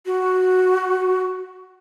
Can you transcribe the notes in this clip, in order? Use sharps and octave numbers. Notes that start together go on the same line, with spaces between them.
F#4